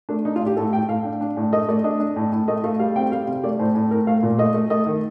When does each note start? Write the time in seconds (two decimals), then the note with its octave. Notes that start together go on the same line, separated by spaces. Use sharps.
0.09 A3 D4
0.25 D4 D#4
0.36 F4
0.41 A2
0.46 G4
0.57 A2 A4
0.73 A2 G5
0.89 A2 F5
1.05 D4
1.21 D4
1.37 A2
1.53 A3 D#5
1.68 A3 D5
1.84 D4 D#5
2.00 D4
2.16 A2
2.32 A2
2.48 A3 D#5
2.64 A3 F5
2.79 G3 F5
2.96 C4 G5
3.12 G3 F5
3.27 C3
3.44 A3 D5
3.59 A2 C5
3.75 A2
3.91 A2 A#4
4.07 A3 F5
4.23 A#2
4.39 A3 D#5
4.54 A3
4.70 A3 D#5
4.86 D#3